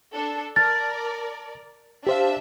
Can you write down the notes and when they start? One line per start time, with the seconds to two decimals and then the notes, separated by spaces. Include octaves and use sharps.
0.13 D4 A4
0.56 A#4 D5 A5 F6 A6
2.07 D4 G4 C5 E5 F5